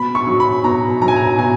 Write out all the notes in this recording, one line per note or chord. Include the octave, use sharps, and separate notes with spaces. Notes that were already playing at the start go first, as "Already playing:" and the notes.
Already playing: B2 B5
C#6
F#3
B5
B2 A#5
F#3 A#5
G#5
A#5
B2 G#5